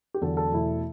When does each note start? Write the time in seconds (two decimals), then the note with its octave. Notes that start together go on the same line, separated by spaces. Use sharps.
0.14 G4
0.21 E2 D3 F#3 A4
0.37 A4
0.52 E2 B2 A3 E4